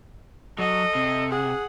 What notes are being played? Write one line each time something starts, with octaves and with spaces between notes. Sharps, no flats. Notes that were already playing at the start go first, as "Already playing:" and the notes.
F#3 A4 D#5
C3
G#4 F#5